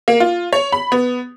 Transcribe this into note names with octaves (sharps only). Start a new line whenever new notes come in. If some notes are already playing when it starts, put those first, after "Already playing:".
A#3
F4
C#5
B5
B3